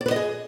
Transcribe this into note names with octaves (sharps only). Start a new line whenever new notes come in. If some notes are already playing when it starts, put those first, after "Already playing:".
D5
B4
D#5
G#4